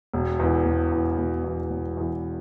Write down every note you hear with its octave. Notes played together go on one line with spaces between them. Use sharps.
E1
E2 E3
E1
E2 E3
E1
E2 E3
E1
E2 E3